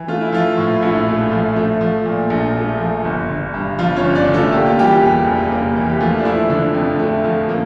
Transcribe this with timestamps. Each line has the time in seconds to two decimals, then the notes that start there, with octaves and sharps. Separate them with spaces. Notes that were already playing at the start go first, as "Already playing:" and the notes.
Already playing: E3
0.08 A3 F4
0.21 E4
0.32 F3 F4
0.57 A2
0.82 A#1 E4
1.07 A3
1.32 F3
1.56 A3
1.81 F3
2.06 A#2
2.30 A#1
2.55 A3
2.80 F3
3.04 G1
3.29 D3
3.54 G2
3.78 G1 F3 F4
3.96 C#4 C#5
4.03 G1
4.15 D4 D5
4.28 D3
4.34 A3 A4
4.53 A#3 G4
4.66 F4
4.77 E3 G3 G4
5.02 E2
5.26 F1
5.51 A#3
5.76 E3
5.89 G4
6.00 F3 A3 F4
6.19 D4
6.25 F3 E4
6.49 D3 D4
6.74 F2
6.99 A3
7.24 F3
7.49 A#3